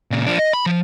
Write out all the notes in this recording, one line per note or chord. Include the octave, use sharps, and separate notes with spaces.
A#2 C#3
F3 D4
D#5
B5
F3